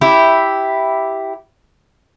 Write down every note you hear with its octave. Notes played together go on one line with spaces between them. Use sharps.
E4 G4